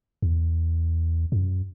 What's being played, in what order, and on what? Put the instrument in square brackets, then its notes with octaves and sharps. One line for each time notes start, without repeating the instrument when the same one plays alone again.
[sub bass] E2
G#2
F#2